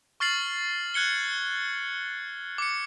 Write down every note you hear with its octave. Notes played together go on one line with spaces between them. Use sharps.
C#6 F6 A6 C7 F#7
F#6 G#6 C#7 G7
D6 C#7